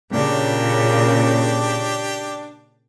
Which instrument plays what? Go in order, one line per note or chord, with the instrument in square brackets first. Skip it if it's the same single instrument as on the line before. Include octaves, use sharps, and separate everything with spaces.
[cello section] A#2 C#3 [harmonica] D4 G4